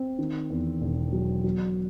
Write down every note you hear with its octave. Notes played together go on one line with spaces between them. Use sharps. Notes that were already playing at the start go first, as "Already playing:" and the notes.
Already playing: C4
D#3
E2
E1
F#3
F#3